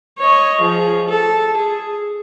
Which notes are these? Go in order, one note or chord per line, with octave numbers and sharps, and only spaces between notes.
C#5 D#5
F3 G#4
A4
G#4